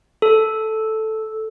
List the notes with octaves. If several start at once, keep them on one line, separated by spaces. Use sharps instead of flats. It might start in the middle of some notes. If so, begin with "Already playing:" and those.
A4